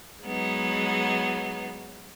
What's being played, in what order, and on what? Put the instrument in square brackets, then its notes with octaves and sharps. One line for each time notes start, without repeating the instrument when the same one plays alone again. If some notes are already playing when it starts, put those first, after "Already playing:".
[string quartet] F#3 G#3 B3 D#4